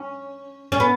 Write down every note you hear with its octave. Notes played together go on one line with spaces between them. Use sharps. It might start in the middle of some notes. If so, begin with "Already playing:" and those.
Already playing: C#4
C#4
B3